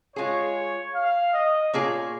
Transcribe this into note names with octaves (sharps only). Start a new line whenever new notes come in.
G#3 F4 G#4 C#5
F5
D#5
A#2 A#3 F4 G#4 C#5